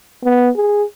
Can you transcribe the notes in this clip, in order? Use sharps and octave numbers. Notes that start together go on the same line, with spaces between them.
B3
G#4